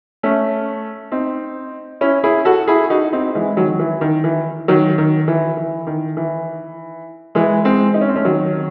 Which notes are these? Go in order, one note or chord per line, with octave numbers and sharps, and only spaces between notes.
A3 C#4
C4 D#4
C#4 E4
E4 G#4
F#4 A4
E4 G#4
D#4 F#4
C4 D#4
E3 G#3
D#3 F#3
F#3
E3
D#3
E3
D#3 F#3
D#3
E3
E3
D#3
E3
E3 G#3
G#3 C4
D#4
C#4
C4
A3 C#4
D#3 F#3